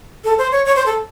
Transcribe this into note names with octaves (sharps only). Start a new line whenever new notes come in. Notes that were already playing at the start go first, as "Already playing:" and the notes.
A4
C5
C#5
C#5
C5
A4